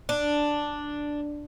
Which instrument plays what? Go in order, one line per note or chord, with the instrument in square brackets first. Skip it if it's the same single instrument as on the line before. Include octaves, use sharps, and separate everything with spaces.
[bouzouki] D4